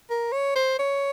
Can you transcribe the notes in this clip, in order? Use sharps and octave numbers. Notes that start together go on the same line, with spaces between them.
A#4
C#5
C5
C#5